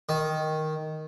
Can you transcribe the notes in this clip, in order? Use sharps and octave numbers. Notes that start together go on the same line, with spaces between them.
D#3